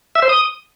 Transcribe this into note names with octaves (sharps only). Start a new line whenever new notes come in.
E5
C5
D#6